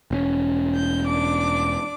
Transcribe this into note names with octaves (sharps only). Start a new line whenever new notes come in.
E1 C4 C#4
G6
D4 D6